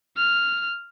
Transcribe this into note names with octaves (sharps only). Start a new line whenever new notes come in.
F6